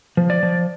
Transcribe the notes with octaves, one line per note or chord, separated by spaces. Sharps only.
F3
D5
F3